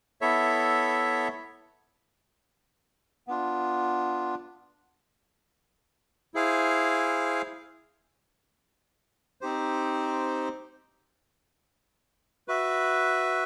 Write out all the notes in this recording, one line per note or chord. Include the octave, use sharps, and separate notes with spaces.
B3 E4 A4 C#5 E5
B3 D4 F4
E4 G#4 C5 F5 G#5
C4 D#4 G4 C5
F#4 B4 E5